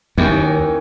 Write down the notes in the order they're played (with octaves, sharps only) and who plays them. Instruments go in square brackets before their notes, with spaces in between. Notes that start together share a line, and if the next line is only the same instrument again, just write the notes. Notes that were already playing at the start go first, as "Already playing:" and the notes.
[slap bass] D#2 [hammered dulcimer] D#3 E3 C#4